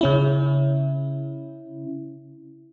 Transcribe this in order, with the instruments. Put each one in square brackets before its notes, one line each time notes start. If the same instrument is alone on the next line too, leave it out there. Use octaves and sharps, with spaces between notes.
[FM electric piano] C#3 C#4 E4